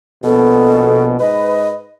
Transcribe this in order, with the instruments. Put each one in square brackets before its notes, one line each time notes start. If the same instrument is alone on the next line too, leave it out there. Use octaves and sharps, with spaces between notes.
[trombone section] A#1 B2 [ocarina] A4
[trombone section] G#2 B4 [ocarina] D#5